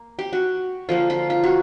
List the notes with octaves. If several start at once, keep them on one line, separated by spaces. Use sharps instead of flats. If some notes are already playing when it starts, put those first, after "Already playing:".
Already playing: A#3
G4
F#4
D3 F3 A#3 F4
F4
F4
F#4